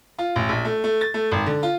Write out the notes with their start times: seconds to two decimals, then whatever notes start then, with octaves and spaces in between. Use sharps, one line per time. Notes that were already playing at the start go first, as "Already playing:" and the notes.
0.18 F4
0.36 A1
0.49 A#1
0.65 A3
0.84 A3
1.01 A6
1.14 A3
1.32 G#1
1.46 D3
1.63 F4